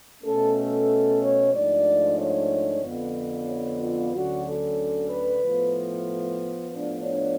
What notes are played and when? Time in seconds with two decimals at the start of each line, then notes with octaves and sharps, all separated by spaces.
0.23 B2 A3 C#4 A4
0.55 A4
1.20 C#5
1.52 G#2 F3 A3 D4 D5
2.16 C#5
2.81 F2 D3 F3 B3
3.46 C#5
3.78 F4
4.11 D2 D3 F#3 C#4 F#4
4.43 A4
5.08 B4
5.41 A2 F3 B3
6.70 A2 F3 B3 D4
7.03 C#5